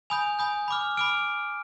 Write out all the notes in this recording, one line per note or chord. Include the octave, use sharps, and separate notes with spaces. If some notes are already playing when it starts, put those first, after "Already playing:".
G#5 B5 D#6 G6 F7
G#5 B5 D#6 G6
B5 D6 F6
B5 D6 F6 D7